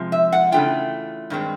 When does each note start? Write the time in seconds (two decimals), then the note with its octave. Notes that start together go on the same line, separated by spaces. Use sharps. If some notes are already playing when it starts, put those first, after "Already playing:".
Already playing: C3 F3 G#3
0.12 E5
0.32 F#5
0.52 C#3 E3 A3 D4 F4 G5
1.30 G2 D#3 G#3 C4